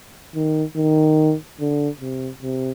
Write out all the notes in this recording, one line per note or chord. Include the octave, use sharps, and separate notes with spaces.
D#3
D#3
D3
C3
C3